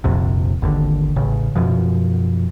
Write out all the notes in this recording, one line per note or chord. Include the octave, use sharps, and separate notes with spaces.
D#1 A#1 F2 C3
G#1 D#2 D3
A1 C#3
F#2 B2 F3